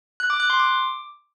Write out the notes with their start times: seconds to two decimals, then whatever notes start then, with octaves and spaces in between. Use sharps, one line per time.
0.20 F#6
0.30 D6
0.40 F#6
0.50 C6
0.60 D6